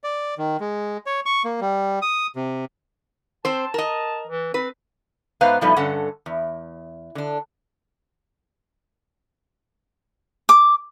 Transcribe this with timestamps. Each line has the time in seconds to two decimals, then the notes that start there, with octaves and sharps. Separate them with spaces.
0.04 D5
0.38 D#3
0.60 G#3
1.06 C#5
1.26 C#6
1.44 A#3
1.61 G3
2.02 D#6
2.36 C3
3.45 C4 C5 A5
3.74 A#4 D#5
4.27 E3
4.54 C4 B4
5.41 G#2 B3 B4 C5 F5 A#5
5.61 A2 F3 G3 A3 B3 D#4
5.76 G2 D3 C#4 A4 F#5
6.26 E2
7.15 D3 D4
10.49 D6